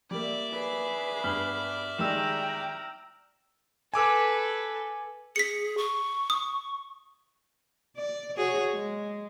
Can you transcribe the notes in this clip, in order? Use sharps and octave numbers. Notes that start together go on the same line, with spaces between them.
G3 A#3 D5 E5
G#4 B4
G2 B3 F6 F#7
D#3 G3 G#3 G5 A#5 E6 E7
A4 B4 G#5 D6 E6
G#4 B6 C#7
C#6
D#6
D5
F#4 G#4 C#5
G#3